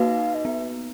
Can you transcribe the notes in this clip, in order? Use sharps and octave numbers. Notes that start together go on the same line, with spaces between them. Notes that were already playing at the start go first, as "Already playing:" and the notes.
Already playing: A#3 D#4 F#4 B4 F5
D#5
B3 E5